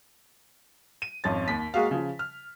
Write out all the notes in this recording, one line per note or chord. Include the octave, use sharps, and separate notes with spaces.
D#7
G#1 F2 C#4 A6
D#2 B6
G#3 A#3 F#4 G#4 F5
C#3 F3
F6